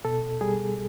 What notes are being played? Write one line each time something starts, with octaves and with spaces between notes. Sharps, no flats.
B2 A4
G3 G#4